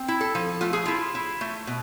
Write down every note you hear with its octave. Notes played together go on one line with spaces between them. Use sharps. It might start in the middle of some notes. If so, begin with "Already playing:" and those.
Already playing: C4
E4
A4
F3
A3 F4
G#4
E4 F4
E4
A3
B2